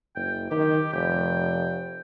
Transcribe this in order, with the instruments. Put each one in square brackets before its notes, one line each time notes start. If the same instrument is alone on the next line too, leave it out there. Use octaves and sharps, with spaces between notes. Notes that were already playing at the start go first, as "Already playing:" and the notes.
[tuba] F#1 [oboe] G5
[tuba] D#3 [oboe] G4
[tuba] F1 [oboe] G5